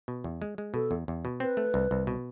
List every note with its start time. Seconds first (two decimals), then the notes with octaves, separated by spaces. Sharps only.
0.08 B2
0.24 E2
0.42 G#3
0.58 G#3
0.74 B2 A4
0.91 E2
1.08 E2
1.25 B2
1.40 C4 B4
1.57 A3
1.74 C2
1.91 C2
2.07 B2